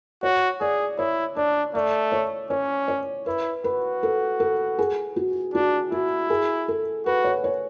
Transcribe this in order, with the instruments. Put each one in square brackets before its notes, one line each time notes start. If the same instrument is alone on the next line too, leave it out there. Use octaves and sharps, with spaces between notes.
[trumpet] F#4 [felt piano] C#5
[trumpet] G#4 [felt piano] D5
[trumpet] E4 [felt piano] C#5
[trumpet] D4 [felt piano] D5
[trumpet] A3 [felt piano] D5
[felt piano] C#5
[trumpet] C#4 [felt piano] C#5
[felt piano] C#5
[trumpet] E4 [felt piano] B4
[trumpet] F#4 [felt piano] B4
[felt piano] A4
A4
G#4
F#4
[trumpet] D4 [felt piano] F#4
[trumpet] E4 [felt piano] F#4
[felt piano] G#4
A4
[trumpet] F#4 [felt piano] B4
[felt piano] C#5
C#5